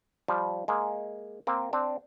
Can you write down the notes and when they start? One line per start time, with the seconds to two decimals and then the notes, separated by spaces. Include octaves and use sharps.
0.28 F3 G3
0.68 G#3 A#3
1.47 A#3 C4
1.73 C4 D4